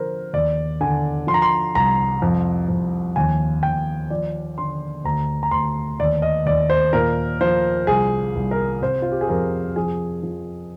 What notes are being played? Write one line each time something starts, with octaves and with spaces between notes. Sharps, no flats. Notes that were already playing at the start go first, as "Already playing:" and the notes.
Already playing: D3 F3 A#4 C5
D#2 D5
D3 G#5
F3 C6
A#5
C6
C2 A#5
F2
F2
D#2 G#5
D#2 G5
F3 D5
D3 C6
D2 A#5
A#5
D2 C6
D#2 D5
D#5
D#2 D5
C5
A#2 A#4
F3 C5
C2 G#4
C2
A#4
C3 C5
F4
G4
G#4
F2 A#4
F3 G#4
F3